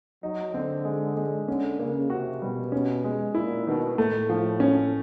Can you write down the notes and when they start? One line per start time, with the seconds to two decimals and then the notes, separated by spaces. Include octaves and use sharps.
0.23 F#3 D#4
0.53 D3 C4
0.85 G#3
1.17 G#3
1.48 D3 C#4
1.79 C#3 A#3
2.10 C3 F#4
2.42 B2 G3
2.72 C#4
3.04 G#3
3.35 A#2 E4
3.66 B2 D#3
3.97 A2 A3
4.29 F3
4.60 C#4